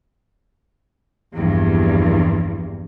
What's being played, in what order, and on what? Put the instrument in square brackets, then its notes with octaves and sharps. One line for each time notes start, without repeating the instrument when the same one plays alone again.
[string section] A#1 E2 G2